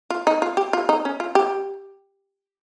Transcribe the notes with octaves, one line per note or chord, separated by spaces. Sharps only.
F4
D#4
F4
G4
F4
D#4
C#4
F4
G4